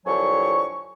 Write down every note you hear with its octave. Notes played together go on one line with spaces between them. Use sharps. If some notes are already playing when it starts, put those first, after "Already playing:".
C2 F2 D3 F#3 G#5 C#6